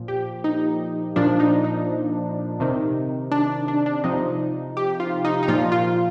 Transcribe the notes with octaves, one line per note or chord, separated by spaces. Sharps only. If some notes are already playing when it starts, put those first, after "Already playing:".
Already playing: A#2 F3
G4
D#4
A#2 F3 D4
D#4
D#4
C3 D#3
D4
D4
D4
C3 F3 D#4
G4
F4
D#4
D#4
A#2 F3 F4
F4